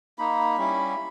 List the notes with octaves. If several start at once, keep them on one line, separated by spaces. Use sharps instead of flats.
A#3 D#4 B5
G3 C#4 E4